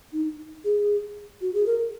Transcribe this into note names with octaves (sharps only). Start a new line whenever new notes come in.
D#4
G#4
F#4
G#4
A#4